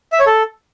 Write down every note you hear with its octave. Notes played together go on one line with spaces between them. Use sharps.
E5
C#5
A4